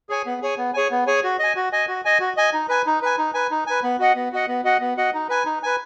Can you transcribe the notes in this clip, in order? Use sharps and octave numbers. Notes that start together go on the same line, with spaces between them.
G#4 C#5 G#5
B3
G#4 C#5 G#5
B3
G#4 C#5 G#5
B3
G#4 C#5 G#5
F#4
D#5 G#5
F#4
D#5 G#5
F#4
D#5 G#5
F#4
D#5 G#5
D#4
B4 G#5
D#4
B4 G#5
D#4
B4 G#5
D#4
B4 G#5
B3
F#4 D#5 F#5
B3
F#4 D#5 F#5
B3
F#4 D#5 F#5
B3
F#4 D#5 F#5
D#4
B4 G#5
D#4
B4 G#5